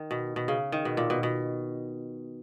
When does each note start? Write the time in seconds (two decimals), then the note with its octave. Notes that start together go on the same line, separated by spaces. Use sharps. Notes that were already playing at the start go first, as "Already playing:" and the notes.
Already playing: D#3
0.11 B2
0.36 B2
0.48 C#3
0.72 D#3
0.85 B2
0.97 A#2
1.10 B2
1.23 B2